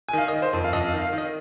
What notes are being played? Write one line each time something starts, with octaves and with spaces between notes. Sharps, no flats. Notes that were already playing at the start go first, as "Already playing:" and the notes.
G#5
D#3 F5
D#5
D#3
C5
F2
F5
F2 D#5
F5
D#3
F5
D#3 D#5